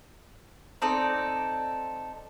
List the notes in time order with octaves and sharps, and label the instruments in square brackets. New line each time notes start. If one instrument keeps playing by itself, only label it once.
[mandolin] C4 D#4 A4 D5